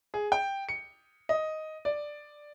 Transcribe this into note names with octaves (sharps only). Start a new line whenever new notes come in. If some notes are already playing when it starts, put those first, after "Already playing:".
G#4
G5
C#7
D#5
D5